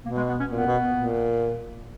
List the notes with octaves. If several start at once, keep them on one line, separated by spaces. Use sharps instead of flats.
B2 A#3
G#3
B3
C#4
A#2 B3
B2
A#2